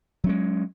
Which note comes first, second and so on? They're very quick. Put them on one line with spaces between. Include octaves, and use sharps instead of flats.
F#3 C#4 G#3